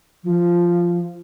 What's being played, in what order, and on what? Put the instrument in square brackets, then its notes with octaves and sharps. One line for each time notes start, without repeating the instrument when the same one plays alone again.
[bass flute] F3